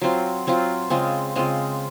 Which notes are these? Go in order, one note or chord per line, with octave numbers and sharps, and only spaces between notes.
F#3 C4 F4
F#3 C4 F4
C#3 G#3 C4 F4
C#3 G#3 C4 F4